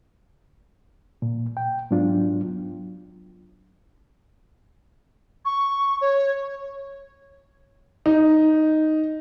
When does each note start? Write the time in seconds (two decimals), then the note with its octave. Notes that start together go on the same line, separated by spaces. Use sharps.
1.22 A#2
1.57 G5
1.91 G#2 F#3 B3 D4 F4
5.45 C#6
6.01 C#5
8.06 D#4